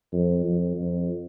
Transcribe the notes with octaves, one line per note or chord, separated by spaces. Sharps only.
F2
F2
F2